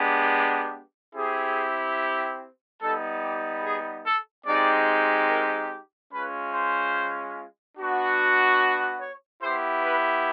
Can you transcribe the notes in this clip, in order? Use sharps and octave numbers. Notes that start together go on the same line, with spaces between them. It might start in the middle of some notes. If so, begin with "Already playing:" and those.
Already playing: G#3 B3 D4 G4
C4 E4 G4 G#4
G3 B3 D#4 A4
G4
G#4
A4
G#3 C4 D#4 G4 D5
A#4
G#3 C#4 F4 B4
C5
B3 D4 F#4
C#5
B3 E4 G4 C5
B4